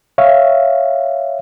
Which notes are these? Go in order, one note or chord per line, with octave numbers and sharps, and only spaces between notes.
C#5 E5 F5